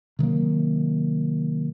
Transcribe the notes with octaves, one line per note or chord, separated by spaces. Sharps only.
C3 D#3 F#3 A#3